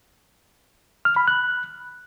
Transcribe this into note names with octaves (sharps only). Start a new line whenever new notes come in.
F6
B5
F#6